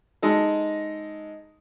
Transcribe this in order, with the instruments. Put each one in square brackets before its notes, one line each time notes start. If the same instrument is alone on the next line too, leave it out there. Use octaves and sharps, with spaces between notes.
[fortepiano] G#3 D#4 A4